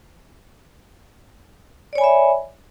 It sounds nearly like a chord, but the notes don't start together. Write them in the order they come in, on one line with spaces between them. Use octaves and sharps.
D5 C#5 G#5 B5 E5